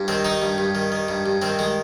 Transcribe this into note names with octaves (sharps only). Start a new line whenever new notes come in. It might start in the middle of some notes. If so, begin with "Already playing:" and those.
Already playing: G2
D#3 C4
D#3 D#4
G2
G2
D#3
D#3
G2
G2
D#3 C4
D#3 G#3